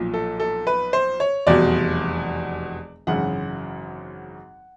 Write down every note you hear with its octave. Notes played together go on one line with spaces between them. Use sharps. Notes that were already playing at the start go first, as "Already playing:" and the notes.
Already playing: B1 A#2 F3
A4
A4
B4
C5
C#5
F1 E2 B2 G3 D5
G#1 F#2 C#3 E3 F#5